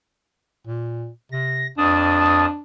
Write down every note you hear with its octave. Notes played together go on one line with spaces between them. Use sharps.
A#2
C3 A#6
F2 D4 A5 D#6